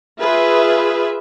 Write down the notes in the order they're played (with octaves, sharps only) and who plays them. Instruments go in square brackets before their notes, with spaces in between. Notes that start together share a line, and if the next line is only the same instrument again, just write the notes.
[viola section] F4 G#4 B4 E5